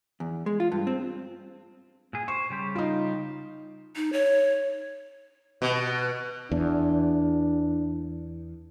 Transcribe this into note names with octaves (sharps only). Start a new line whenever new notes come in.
E2
G#3
F4
G2
C4
A#2 G#4
C5 C#6
C#3 G3 G4
D#4 F4
D#4
C#5
B2
E2 D4